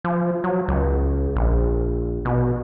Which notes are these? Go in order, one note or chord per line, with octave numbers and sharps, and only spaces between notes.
F3
F#3
C#2
A#1
B2